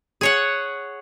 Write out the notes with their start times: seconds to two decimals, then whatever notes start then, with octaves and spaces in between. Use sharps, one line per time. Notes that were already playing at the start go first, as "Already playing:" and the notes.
0.21 G#4 C#5 F#5